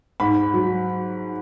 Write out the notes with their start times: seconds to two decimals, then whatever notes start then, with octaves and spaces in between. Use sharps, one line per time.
0.20 G#2 B5
0.54 F#3